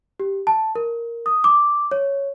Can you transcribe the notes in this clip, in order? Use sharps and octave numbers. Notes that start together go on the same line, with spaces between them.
G4
A5
A#4
D#6
D6
C#5